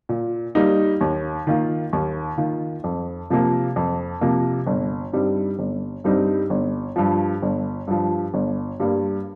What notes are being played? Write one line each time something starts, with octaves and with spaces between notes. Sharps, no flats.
A#2
G3 A#3 D#4
D#2
D#3 A#3 F4
D#2
D#3 A#3 F4
F2
C3 F3 A#3
F2
C3 F3 A#3
G1
G2 G3 C4 D#4
G1
G2 G3 C4 D#4
G1
G2 F3
G1
G2 F3
G1
G2 G3 A#3